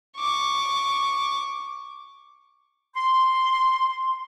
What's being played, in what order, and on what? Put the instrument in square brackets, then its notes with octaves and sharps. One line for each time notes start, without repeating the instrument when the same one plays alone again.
[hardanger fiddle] C#6 D6
[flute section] C6